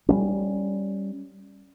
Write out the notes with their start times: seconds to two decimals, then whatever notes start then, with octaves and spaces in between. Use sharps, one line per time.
0.09 G3 A3 C#4